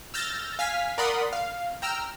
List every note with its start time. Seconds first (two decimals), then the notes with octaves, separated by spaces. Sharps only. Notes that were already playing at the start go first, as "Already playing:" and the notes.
0.14 E6 F6 G6 A6 A#6
0.59 F5 G#5 F6 B6
0.98 A#4 D5 F#5 B5 C6 D#6
1.33 F5
1.82 G5 A#5 E6 F6